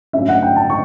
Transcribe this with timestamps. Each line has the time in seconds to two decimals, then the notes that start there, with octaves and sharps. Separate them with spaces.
0.13 G2 F#3 A3 C#4 E5
0.29 F#5
0.42 G5
0.56 A5
0.70 C#6